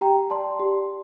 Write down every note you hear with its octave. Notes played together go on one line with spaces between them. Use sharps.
G4 G5 A#5
D5 A5 C6
G4